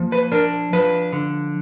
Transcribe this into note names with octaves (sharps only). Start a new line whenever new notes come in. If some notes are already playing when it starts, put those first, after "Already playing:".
Already playing: F3 A#3
B4
D4 A#4
F3 B4
D3